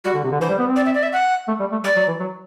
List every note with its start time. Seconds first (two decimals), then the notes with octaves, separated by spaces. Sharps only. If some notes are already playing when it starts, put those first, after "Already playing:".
0.05 G3 F#4
0.14 D3
0.24 C3
0.32 D3
0.40 E3 C5
0.49 G3
0.58 B3
0.67 C4
0.76 D5
0.86 E5
0.94 D5
1.03 E5
1.13 F#5
1.48 A3
1.60 G3
1.72 A3
1.84 G3 D5
1.96 F#3
2.08 E3
2.20 F#3